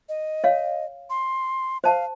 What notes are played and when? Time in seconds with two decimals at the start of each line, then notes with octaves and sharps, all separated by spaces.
0.09 D#5
0.44 C#5 F5
1.10 C6
1.84 C5 F5 A5